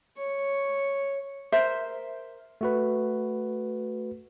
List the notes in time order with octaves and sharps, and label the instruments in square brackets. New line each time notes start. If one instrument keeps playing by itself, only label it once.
[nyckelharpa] C#5
[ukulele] A#4 C5 E5
[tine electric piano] A3 F#4 B4